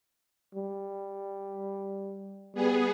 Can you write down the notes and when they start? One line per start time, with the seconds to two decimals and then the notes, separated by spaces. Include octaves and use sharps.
0.55 G3
2.54 G3 B3 G#4